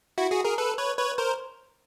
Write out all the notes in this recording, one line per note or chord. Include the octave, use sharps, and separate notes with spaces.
E4 F#4
F#4 G#4
G#4 A#4
A4 B4
B4 C#5
B4 C#5
A#4 C5